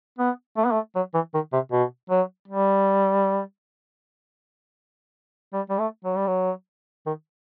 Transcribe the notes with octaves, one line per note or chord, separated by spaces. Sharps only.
B3
A3
B3
A3
F#3
E3
D#3
C3
B2
F#3
G3
G3
G3
A3
F#3
G3
F#3
D#3